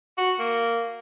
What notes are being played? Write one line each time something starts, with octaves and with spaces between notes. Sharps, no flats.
F#4
A#3